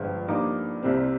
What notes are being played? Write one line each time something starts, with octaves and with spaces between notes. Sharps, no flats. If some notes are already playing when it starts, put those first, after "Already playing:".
Already playing: G1 G2 F3 G#3
G2 F3 A#3 D#4 D6
C2 C3 G3 C4